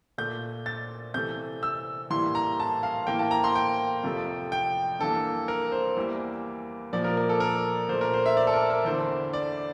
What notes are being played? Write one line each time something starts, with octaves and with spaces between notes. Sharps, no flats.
A#2 A3 G6
A6
C3 E3 A3 G6
E6
A2 E3 G3 A#3 C6
A#5
A5
F5
A2 E3 A#3 G5
A5
A#5
C6
G5
F2 C3 F3 A3
G5
G2 E3 A#3 A4
A#4
C5
E2 E3 G3 A#3
A#2 F3 A#3 D5
A#4
A#4
A4
A#4
A#2 A3 C5
A#4
C5
E5
D5
A4
A#4
A#4
E2 D3 A3 C5
D5